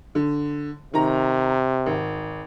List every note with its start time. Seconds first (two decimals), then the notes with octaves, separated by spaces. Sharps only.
0.15 D3
0.94 C3 D#3 A#5
1.86 G#1